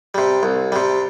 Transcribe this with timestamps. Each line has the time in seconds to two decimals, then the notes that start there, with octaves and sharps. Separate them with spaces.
0.14 C3 G3
0.43 C2
0.72 C3 G3